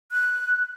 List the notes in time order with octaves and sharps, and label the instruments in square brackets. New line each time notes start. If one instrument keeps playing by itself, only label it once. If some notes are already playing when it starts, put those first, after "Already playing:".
[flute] F#6